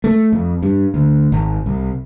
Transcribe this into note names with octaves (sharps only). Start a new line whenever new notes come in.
A3
F2
G2
D2
G#1
C2